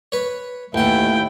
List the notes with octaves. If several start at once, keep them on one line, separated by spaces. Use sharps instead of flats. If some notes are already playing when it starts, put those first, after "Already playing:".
B4 C#5
A1 D#2 E4 F#5 G5